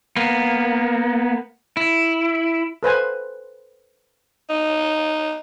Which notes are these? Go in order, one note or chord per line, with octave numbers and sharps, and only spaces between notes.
A#3 B3
E4
A4 B4 C5 G#5
D#4